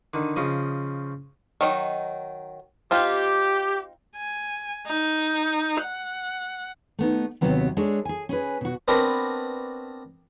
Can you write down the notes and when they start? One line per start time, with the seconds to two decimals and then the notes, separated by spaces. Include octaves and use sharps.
0.14 D3 D#3
0.36 C#3 F3 D#5
1.61 D#3 F#3 D#4
2.91 C4 D#4 F4 G4
4.17 G#5
4.87 D#4
5.81 F#5
6.99 A3 B3 D#4
7.41 D#2 C3 F#3 B3 C4
7.77 G#3 D4 A4 C#5
8.05 G#4 G#5
8.29 C#4 G#4 B4
8.61 B2 F#4
8.88 B3 C4 D4 F#4 A#4 B4